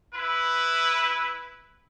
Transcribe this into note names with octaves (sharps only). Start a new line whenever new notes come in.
E4 B4